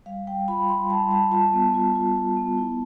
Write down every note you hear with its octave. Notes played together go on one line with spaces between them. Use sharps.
G3 F5
G3 G5
F4 B5
G3 C6
G3 A5
G3 A5
F4 A5
B3
F4
F4
F4
B3
E4